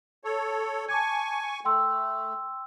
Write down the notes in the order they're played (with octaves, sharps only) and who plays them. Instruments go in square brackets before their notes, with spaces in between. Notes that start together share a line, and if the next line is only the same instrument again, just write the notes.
[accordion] A4 C#5
[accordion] G#5 C#6 [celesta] A5 D6 G#6
[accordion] A3 [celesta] G5 C6 E6